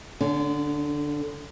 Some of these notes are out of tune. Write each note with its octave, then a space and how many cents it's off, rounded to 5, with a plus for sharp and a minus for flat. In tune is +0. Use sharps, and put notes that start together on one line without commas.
D3 +0 C#4 +40